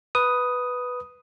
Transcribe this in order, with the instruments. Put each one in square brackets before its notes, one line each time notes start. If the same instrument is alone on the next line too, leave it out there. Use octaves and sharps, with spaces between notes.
[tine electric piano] B4 D#6